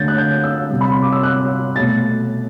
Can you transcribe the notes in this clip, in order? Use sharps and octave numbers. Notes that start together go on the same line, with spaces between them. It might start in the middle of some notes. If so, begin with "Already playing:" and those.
Already playing: D3 A3 G6 A6
F#6
G6
E6
C3 G3
B5
C6
D6
E6
F#6
B2 A3 A6